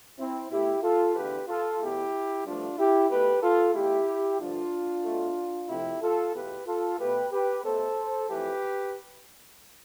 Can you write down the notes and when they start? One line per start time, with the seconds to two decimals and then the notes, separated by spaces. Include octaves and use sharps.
0.18 C4 E4
0.50 B2 A3 E4 G4
0.82 F4 A4
1.15 E2 D3 A3 G4 B4
1.48 F4 A4
1.80 E2 B2 A3 E4 G4
2.44 G2 F3 A3 D4 F4
2.78 E4 G4
3.10 B2 A3 G4 B4
3.42 F4 A4
3.74 E2 B2 A3 E4 G4
4.40 G2 D3 F3 A3 D4 F4
5.04 B2 A3
5.69 F2 C3 F3 A3 E4 G4
6.02 F4 A4
6.34 E2 B2 A3 G4 B4
6.67 F4 A4
6.98 B2 A3 G4 B4
7.31 G4 B4
7.64 B2 A3 A4 C5
8.28 F2 E3 A3 G4 B4